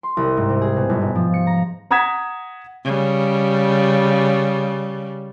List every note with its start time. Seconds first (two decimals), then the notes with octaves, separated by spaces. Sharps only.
0.03 C6
0.17 C2
0.37 G#2
0.50 C3
0.61 G#4
0.76 B2
0.89 G1
1.02 G#2
1.15 F3
1.34 C#7
1.47 A#5
1.91 F#5 A#5 D#6 G#6 B6 E7
2.85 C#3 G3